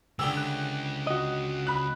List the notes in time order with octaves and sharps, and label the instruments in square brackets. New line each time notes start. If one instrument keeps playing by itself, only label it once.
[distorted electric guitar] C#2 [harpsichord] D3 G4 G#4 [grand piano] E6
[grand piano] F#6
[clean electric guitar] F#4 D#5
[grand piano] B5 F#6